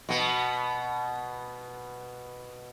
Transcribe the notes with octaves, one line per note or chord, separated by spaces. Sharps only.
B2 B3